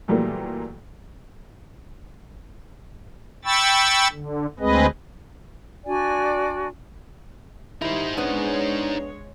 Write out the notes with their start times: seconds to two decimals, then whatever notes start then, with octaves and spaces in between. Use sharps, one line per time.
0.08 A#2 E3 F#3 G3 A3 A#3
3.45 G5 B5 C#6 E6 A6
4.12 D3
4.60 D2 G#3 C4 G#4 B4 D#5
5.85 D4 F#4 D5 G#5
7.82 D#3 G3 D#4 E4 C5
8.17 G#3 B3 C#4 D4 C#5